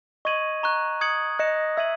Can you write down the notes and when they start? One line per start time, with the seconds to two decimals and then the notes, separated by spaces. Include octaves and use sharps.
0.25 D#5 C#6 G#6 D#7 F#7
0.63 A#5 C#6 F#6
1.01 D#6 G#6 C#7 F#7
1.39 D#5 F#6 C#7 E7
1.77 E5 E6 G#6 D#7 F#7